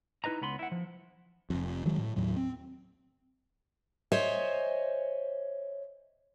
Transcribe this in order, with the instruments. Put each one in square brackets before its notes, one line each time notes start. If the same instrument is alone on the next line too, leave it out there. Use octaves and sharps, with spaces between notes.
[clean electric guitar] D#4 E4 B4 D#5 A#5
C#2 B3 B5 C6
E4 F#5
F3
[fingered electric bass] F1 F2
D#3 F3 F#3 G#3
A2
D#2 A2 F#3
C4
[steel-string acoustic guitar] C5 C#5 D#5 E5 G#5